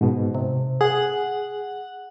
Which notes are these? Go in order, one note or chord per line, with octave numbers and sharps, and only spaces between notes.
G#2 B2
C3
G#4 F#5